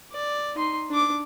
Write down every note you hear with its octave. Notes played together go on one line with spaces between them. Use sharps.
D5
D#4 C6
D4 D6